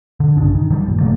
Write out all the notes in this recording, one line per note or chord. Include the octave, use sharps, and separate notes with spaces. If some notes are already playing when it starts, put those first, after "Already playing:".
D3
A#1 G2 C#3 D4
D#3
D#3 F#3 G3
G1 A#2
C#3 F#3 A3 A#3